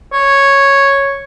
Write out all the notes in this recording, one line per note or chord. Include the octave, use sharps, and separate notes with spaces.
C#5